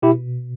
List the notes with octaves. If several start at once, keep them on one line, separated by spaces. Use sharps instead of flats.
B2 E4 G4